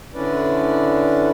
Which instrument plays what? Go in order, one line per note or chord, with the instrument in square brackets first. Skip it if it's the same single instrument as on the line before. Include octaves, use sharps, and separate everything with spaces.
[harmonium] D3 C#4 D4 E4 B4 D5